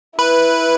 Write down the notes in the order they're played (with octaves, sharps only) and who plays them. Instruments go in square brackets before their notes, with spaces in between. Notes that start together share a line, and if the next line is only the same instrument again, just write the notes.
[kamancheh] E4 [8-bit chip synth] B4